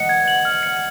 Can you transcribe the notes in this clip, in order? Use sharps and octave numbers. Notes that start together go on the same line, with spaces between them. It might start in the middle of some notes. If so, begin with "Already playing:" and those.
Already playing: D#5 F#5 C#7
G#6
F#7
F6
C#7